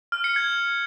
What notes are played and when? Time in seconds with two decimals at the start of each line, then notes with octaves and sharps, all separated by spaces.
0.12 F6
0.24 C#7
0.36 G#6